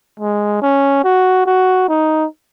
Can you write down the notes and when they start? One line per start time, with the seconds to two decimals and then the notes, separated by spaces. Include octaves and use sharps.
0.20 G#3
0.62 C#4
1.04 F#4
1.46 F#4
1.88 D#4